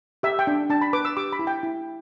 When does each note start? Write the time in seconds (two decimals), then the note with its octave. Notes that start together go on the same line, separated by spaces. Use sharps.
0.23 G4 E5
0.39 G5
0.47 D4
0.70 D4 A5
0.81 B5
0.93 B4 D6
1.05 E6
1.17 G4 D6
1.32 B5
1.39 E4
1.47 G5
1.63 E4